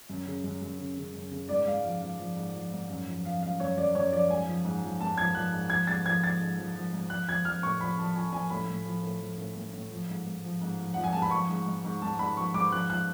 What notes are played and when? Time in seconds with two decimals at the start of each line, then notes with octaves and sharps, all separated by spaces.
0.09 F#2
0.26 C#3
0.44 F#2
0.62 F#2
0.79 C#3
0.97 C#3
1.14 F#2
1.31 C#3
1.49 G#2 D5
1.66 G#2 F5
1.85 F3 F5
2.01 F3 F5
2.19 F3
2.36 G#2
2.54 F3
2.72 G#2
2.89 F#2
3.07 F3
3.25 F3 F5
3.42 F#2 F5
3.59 F#2 C#5
3.77 F#2 D5
3.95 F#2 C#5
4.12 F3 D5
4.30 G#2 G#5
4.48 F3
4.65 G#2
4.83 F3
5.01 G#2 A5
5.18 F3 G#6
5.35 F3 F#6
5.53 G#2
5.70 F3 G#6
5.87 G#2 A6
6.05 F3 G#6
6.22 F3 A6
6.41 G#2
6.58 F3
6.76 F3
6.93 G#2
7.10 F3 F#6
7.28 F3 G#6
7.45 F3 F6
7.63 A2 C#6
7.81 F3 B5
7.98 F3 A5
8.15 F3 G#5
8.33 F3 G#5
8.50 A2 B5
8.69 A2
8.86 F3
9.03 A2
9.20 F3
9.38 A2
9.55 A2
9.74 A2
9.91 F3
10.09 G#2
10.26 G#2
10.44 F3
10.61 G#2
10.79 F3
10.94 F3 F#5
11.04 G#5
11.13 G#2 A5
11.22 B5
11.31 F3 C#6
11.49 G#2
11.66 G#2
11.84 G#2
12.02 G#2 A5
12.19 G#2 B5
12.36 F3 C#6
12.54 G#2 D6
12.71 F3 F#6
12.90 F3 F#6